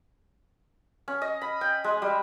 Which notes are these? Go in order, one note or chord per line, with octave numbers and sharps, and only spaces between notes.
C#4
D#5
B5
G5
G#3
G3